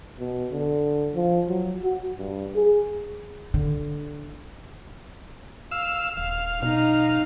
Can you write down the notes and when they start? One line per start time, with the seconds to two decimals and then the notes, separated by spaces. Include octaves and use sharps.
0.19 B2
0.52 D3
1.15 F3
1.49 F#3
1.83 F#4
2.18 G2
2.55 G#4
3.54 D3
5.71 F5 E6
6.17 D#1 F5
6.62 B2 D#4